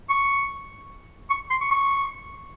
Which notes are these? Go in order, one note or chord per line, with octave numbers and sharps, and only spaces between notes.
C#6
C#6
C6
C#6
C#6